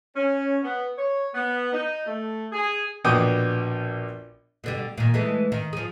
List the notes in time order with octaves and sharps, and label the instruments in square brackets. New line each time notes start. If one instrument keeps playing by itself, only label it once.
[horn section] C#4
B3
C#5
B3
D#4
A3
G#4
[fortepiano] A#1 B2 G5 D6 D#6
[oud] B2 D3 G3
A#2 D#3
E3 G#3 A3
D#3
F3 G#4